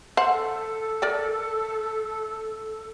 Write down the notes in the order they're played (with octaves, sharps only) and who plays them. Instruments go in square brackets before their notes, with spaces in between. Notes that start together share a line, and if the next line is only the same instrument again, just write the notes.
[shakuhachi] A4 [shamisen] C5 F#5
[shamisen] A#4 D5 G5